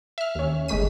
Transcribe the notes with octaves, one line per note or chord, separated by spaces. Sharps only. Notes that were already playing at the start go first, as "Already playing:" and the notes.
E5 F6
D#2 C#4
G1 G#3 A3 B6 D#7